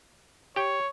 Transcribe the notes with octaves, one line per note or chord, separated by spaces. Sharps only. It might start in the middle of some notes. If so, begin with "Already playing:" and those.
G4 C#5 G5